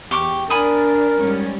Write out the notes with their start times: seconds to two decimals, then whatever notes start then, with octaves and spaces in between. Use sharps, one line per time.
0.11 E2 G4 C#6 D6
0.50 D4 A#4 G#5 B5 D#6
1.20 G#2 G3 C#4